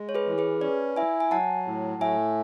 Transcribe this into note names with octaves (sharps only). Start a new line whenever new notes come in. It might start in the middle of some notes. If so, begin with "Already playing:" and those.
Already playing: G#3
C#5
G#4 B4
E3
G#4 B4
C#4 B4 D5
E4 E5 G#5
G#5
F#3 F#5 A5
A2
A3 E5 G#5